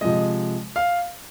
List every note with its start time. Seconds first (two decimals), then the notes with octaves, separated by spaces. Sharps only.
0.01 C3 F3 G#3 D#5
0.76 F5